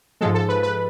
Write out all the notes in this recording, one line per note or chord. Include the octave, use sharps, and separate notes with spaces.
G#2 F3 G#3 A4
A4
B4
B4